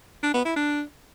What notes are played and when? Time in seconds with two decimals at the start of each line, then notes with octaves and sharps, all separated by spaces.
0.23 D4
0.34 B3
0.45 E4
0.56 D4